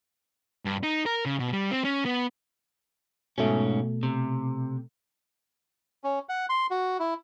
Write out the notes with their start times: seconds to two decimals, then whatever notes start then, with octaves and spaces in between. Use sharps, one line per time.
0.65 G2
0.83 D#4
1.06 A#4
1.26 C#3
1.39 B2
1.53 G3
1.71 C4
1.84 C#4
2.05 B3
3.38 G#2 B2 A3 C#4
4.03 C3
6.04 C#4
6.29 F#5
6.49 C6
6.71 F#4
6.99 E4